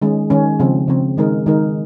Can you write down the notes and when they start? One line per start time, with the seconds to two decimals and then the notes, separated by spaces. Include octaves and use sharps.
0.02 D#3 G#3 C#4
0.30 D#3 G#3 C#4
0.59 C#3 F3 C4
0.88 C#3 F3 C4
1.17 D#3 G#3 D#4 A#4
1.46 D#3 G#3 D#4 A#4